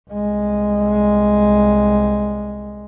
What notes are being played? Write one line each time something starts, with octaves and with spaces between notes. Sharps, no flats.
C2 G#3